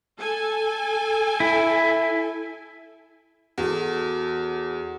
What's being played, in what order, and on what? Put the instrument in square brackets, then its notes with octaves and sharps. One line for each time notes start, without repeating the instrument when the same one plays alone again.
[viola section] A4 G#5
[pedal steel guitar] E4
[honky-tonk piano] E2 [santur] F#4 A4